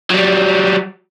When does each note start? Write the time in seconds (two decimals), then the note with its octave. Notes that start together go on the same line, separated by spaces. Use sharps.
0.10 F#3 G3